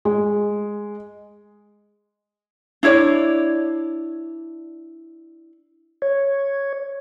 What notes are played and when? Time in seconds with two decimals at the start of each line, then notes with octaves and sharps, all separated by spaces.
0.05 G#3
2.83 D4 E4 C#5 D5
6.02 C#5